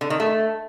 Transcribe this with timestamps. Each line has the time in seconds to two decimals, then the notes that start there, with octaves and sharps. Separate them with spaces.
0.01 D3
0.10 D#3
0.20 A3